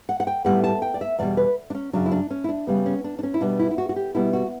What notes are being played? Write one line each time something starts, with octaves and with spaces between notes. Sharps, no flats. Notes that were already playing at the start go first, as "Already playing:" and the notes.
F#5
F#5
G5
A2 G3 B3 F#5
A5
G5
D5
E5
E2 B2 G3 D5
B4
D4
C#4
F#2 C#3 F#3 D4
E4
D4
C#4
E4
D4
C#3 G3 B3
C#4
D4
D4
C#4
E4
B2 G3 B3 D4
E4
E4
F#4
F#4
G4
B2 G3 B3 E4
F#4